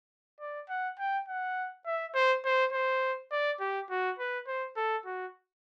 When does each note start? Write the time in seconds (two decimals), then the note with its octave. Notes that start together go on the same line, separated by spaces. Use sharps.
0.40 D5
0.69 F#5
0.98 G5
1.29 F#5
1.86 E5
2.15 C5
2.45 C5
2.73 C5
3.31 D5
3.60 G4
3.90 F#4
4.19 B4
4.47 C5
4.77 A4
5.06 F#4